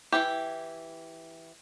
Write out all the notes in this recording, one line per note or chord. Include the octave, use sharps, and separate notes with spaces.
E3 E4 G4